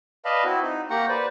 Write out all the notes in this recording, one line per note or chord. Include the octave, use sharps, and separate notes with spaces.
B4 D5 D#5 F5 A5 B5
C4 E4 F#4
D#4
A#3 G4 F#5 G5 A#5 C#6
B4 C5 D5